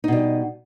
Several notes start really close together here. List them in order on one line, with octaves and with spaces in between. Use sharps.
D#4 B2 G3